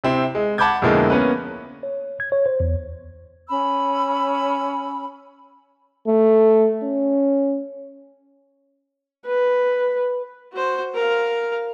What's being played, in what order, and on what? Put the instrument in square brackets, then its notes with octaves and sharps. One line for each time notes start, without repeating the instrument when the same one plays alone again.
[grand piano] C3 C4 E4
G#3
F#5 A5 B5 D6 G6 G#6
F2 B2 D3 G#3 A#3 E4
A#3 B3 C#4 B4
[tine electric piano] C#5
G#6
C#5
C5
E2
[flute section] C#4 B5 E6
[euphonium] A3
C#4
[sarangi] B4
[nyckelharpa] F#4 C5
A#4 F5